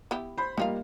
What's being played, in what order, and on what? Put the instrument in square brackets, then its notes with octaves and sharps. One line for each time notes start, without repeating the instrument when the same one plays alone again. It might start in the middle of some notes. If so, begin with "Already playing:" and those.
[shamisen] B3 E4 G4
[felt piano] C5 B5
[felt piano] G3 A#3 [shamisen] D#4 F4 F5